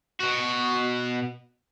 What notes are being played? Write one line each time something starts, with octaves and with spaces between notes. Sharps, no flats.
B2 F#4